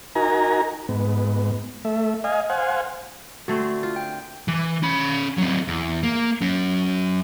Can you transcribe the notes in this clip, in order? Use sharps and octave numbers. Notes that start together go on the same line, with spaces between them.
D#4 F#4 A#4 G#5 A#5
G#2 B3
A3 E5
D#5 F5 G#5
C5 F5 F#5 G#5
D3 A3 C4 F#4
F4
G5
E3
C#4 B5
F#3 C4
E2
A#3
F#3 C#4